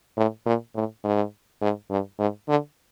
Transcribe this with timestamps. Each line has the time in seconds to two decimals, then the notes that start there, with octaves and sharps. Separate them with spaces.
0.17 A2
0.46 A#2
0.75 A2
1.04 G#2
1.62 G#2
1.90 G2
2.19 G#2
2.48 D3